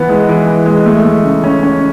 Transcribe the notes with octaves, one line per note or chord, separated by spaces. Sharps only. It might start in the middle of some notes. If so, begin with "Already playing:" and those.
Already playing: E3 B3
G#3
E3
E3
G#3
A3
A3
C#3
C#4
C#4